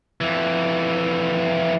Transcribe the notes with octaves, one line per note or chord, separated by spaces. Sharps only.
F2 E3